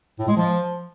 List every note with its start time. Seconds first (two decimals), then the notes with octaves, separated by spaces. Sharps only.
0.19 A2
0.28 G#3
0.37 F3